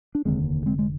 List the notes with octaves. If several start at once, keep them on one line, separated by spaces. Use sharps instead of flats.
D4
F1 D#2 D3 G#3 C4
G#3 C4
G#3